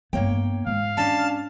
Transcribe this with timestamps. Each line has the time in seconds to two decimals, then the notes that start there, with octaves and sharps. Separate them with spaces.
0.13 G2 A#3 B3 C#5 G5
0.67 G#2 F5
0.97 C#4 D4 A5